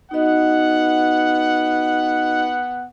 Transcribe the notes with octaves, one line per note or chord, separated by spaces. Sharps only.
B3 D#4 F#4 D#5 F#5